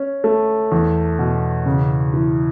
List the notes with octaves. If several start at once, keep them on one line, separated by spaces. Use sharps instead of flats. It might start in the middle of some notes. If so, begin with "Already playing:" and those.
Already playing: C#4
A3
E2
B2
C#3
E3